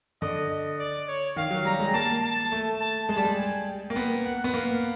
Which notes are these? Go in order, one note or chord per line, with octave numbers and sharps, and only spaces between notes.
D3 D#5
D#5
D5
C#5
D#3 F5
F#3
G3 A#5
G#3
A#3 A5
A5
A3
A5
G#3 A5
G3
G#3
G#5
G5
A#3
B3
F#5
B3
A#3 F5